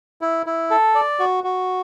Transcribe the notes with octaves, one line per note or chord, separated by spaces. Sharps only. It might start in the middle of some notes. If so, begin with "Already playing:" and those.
E4
E4
A4
D5
F#4
F#4